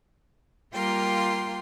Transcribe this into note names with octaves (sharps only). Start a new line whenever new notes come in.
G3 A#3 F4 A#4 G5 C6